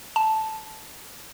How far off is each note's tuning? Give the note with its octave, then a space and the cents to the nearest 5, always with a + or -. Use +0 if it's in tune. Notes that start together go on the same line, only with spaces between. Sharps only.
A5 -5